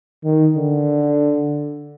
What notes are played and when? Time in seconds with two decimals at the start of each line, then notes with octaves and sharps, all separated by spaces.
0.24 D#3
0.56 D3